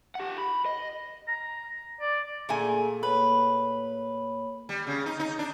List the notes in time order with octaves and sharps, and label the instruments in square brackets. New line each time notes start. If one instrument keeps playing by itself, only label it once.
[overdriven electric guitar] G4 F#5
B5
D#5
[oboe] A#5
D5
[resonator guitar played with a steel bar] A#2 A3 G#5 [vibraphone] A#3 G#4 A4
[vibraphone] A#3 C#5 [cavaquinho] B4
[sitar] G3
C#3
D#4
D#4
D4